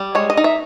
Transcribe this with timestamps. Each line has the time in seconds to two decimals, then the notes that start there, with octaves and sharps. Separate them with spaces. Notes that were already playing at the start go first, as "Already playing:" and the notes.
Already playing: G3
0.15 G#3 C#5
0.30 D#5
0.37 D#4
0.44 E5